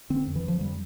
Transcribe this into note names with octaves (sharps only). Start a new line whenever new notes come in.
D3 C4
F2
E3
D3 F3
F2 G3